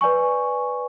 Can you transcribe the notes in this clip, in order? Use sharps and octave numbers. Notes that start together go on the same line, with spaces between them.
B4 D5 G#5 C#6